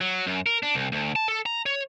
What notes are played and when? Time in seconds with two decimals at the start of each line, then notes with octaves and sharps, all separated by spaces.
0.01 F#3
0.27 F#2
0.46 A#4
0.63 D4
0.75 C2
0.92 D2
1.16 A5
1.28 A4
1.46 A#5
1.66 C#5